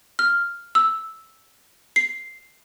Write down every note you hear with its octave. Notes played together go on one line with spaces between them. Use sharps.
F6
E6
C7